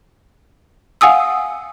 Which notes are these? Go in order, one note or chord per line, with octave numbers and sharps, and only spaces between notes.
F5 F#5 G#5 D#6 E6